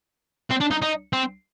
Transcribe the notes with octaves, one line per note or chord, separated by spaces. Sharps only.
C4
D4
D#4
D#4
C4